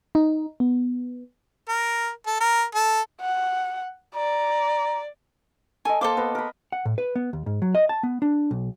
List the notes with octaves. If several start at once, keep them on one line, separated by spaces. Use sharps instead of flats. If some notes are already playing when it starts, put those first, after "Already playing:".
D#4
B3
A#4
A4
A#4
A4
F#5
D5 A#5
A4 D#5 G#5
A#3 A4 C5 C6 D6
B3 A#4
A#4 B5
F#5
A2
B4
B3
D#2
G#2
F#3
D#5
A5
B3
D4
B1